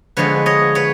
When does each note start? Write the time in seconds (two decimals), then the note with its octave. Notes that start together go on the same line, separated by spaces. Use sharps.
0.17 D3 F3 G#3 B3 B4 C#5
0.46 C#5 D#5
0.75 B4 C#5